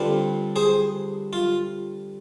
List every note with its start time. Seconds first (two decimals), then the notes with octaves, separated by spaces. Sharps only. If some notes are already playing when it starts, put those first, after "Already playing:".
Already playing: G2 D3 G3 C4 F4
0.56 G#4 C5
1.33 F4